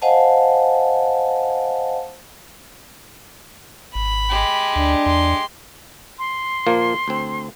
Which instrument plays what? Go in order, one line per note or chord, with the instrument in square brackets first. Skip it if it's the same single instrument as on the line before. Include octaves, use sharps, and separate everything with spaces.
[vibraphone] C5 D#5 F5 F#5 G#5 A5
[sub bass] G#1 [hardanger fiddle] B5
[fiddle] G#3 G4
[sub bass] D2 [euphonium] D4
[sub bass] E2 [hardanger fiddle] C6
[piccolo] C6
[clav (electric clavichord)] A#2 F3 A#3
D2 C4